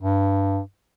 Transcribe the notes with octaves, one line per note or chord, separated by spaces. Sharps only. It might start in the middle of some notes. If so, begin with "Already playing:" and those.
G2